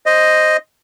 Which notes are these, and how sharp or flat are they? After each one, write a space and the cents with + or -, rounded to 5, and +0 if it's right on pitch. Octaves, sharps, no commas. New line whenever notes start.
C5 +0 D#5 +0